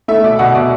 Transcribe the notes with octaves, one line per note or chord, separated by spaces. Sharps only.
A3 E5
B2 D5
B2 F#5
B2 D5